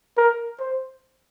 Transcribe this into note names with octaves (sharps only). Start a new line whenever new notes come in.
A#4
C5